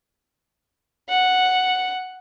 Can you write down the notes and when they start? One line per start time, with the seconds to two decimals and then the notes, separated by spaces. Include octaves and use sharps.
1.09 F#5